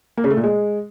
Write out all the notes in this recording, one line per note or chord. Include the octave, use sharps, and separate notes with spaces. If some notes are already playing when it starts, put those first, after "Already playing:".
A#3
C#3
A3
A#2
G#3